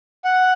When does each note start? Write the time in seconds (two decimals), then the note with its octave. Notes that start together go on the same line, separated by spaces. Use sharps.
0.25 F#5